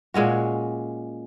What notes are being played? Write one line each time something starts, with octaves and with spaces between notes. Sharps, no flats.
A#2 G#3 C#4 F#4